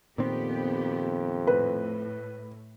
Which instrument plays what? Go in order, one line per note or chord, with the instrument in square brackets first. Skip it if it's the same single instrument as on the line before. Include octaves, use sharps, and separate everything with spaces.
[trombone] F2 [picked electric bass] A#2 D#3 C4 [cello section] B3 G4
[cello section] A2 [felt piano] B4